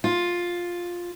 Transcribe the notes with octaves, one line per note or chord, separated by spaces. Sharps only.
F4